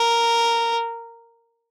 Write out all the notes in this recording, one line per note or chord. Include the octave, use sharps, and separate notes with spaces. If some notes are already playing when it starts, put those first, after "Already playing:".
Already playing: A#4